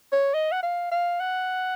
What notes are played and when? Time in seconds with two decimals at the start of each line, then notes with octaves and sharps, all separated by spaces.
0.12 C#5
0.34 D#5
0.52 F#5
0.63 F5
0.92 F5
1.20 F#5